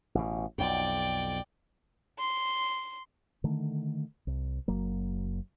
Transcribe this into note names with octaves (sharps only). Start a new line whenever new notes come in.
A1 B2
B1 F2 D5 G5
C6
D3 D#3 A3
C2
F#1 F#3 A#3